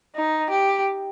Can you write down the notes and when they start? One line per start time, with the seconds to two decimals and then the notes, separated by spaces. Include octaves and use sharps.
0.16 D#4
0.51 G4